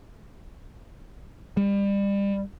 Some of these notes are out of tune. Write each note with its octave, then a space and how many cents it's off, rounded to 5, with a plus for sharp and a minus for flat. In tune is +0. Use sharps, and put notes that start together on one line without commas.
G3 +30